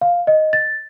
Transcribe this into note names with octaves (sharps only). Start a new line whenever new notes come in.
F5
D#5
A6